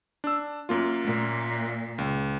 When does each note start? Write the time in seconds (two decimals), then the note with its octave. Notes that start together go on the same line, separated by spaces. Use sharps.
0.24 D4 E6
0.69 F#2 A#3 F4
1.05 A#2
1.98 C#2